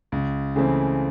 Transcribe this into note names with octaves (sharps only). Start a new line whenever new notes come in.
C#2
C#3 E3 A3 C4